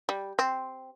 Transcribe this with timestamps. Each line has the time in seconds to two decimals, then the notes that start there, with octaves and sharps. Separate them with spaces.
0.09 G3
0.39 C4